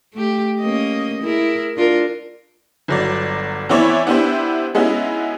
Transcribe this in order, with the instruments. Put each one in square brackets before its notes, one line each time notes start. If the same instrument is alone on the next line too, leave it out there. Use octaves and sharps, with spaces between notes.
[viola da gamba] A3 G4
A#3 C#4 D#5
E4 G#4 A#4
D4 F4 A#4
[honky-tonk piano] G1 F#3 D5
E3 B3 C4 E4 C#5 D5
B3 D4 E4 G4 C5
G#3 B3 C#4 D#4 E4 F#4